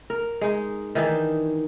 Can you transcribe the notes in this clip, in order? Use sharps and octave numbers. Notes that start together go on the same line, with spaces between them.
A#4
G#3 D#4
D#3 E3 D4 D#4